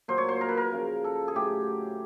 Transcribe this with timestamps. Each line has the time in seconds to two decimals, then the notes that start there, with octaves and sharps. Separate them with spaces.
0.08 A#2 F#3 C5
0.18 C#5
0.29 C5
0.41 A#4
0.49 B4
0.57 A#4
0.72 C#3 F3
1.04 A4
1.28 G#4
1.35 A2 F#3 G4